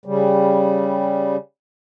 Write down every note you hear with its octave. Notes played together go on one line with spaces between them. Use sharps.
C#3 G3